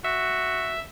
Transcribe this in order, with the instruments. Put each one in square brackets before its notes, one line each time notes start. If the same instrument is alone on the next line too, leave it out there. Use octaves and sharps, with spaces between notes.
[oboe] F#4 [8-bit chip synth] E5